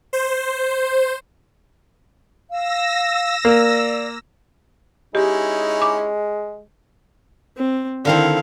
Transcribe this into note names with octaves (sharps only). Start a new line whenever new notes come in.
C5
F5 E6 A#6
A#3 D5
G#3 C#4 D#4 E4 G4
D6
C4
D3 D#3 C4 E4 F5